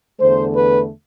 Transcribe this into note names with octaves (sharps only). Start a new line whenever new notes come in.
E2 D3 A3 C5
B4